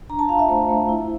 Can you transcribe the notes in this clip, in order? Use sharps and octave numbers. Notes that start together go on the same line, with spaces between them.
D4 A#5
A5
F4 F5
E5
A3 C5
A3
E4